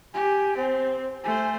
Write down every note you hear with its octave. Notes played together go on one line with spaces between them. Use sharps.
G4 G#5
C4 C5
A3 C5 G#5